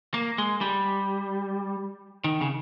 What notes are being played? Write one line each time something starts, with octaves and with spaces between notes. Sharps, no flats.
A#3
G#3
G3
D#3
C#3